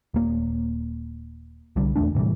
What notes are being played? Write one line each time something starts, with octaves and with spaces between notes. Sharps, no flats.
D#1 A#3
C2 D3 G3
D#1 E2 A3 D4
A2 C3 E3 G3